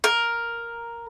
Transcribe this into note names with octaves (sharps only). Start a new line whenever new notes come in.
A#4